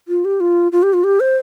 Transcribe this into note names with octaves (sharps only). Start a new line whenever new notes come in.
F4
G4
F4
F4
G4
F4
G4
C5